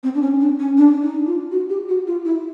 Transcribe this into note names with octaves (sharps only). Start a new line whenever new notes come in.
C4
D4
C#4
D4
C#4
D4
D#4
F4
F#4
G4
F#4
F4
E4